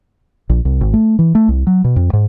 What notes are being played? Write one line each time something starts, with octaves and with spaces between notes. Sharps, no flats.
A#1
C2
G#1
A3
E3
A3
C2
F#3
B2
F2
G#2